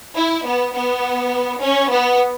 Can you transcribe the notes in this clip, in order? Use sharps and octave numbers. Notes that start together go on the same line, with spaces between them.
E4
B3
B3
C#4
B3